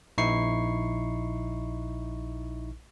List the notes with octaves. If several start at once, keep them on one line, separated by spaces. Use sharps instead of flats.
A#1 D#4 E4 C#6 C7